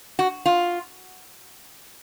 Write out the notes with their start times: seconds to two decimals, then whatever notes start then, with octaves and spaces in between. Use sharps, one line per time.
0.19 F#4
0.46 F4